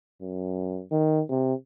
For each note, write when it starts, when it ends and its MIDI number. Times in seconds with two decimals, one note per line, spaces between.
0.21 0.82 42
0.91 1.22 51
1.29 1.54 48